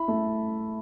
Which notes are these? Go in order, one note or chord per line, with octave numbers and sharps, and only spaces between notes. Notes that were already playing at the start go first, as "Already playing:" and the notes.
Already playing: E4 B5
A3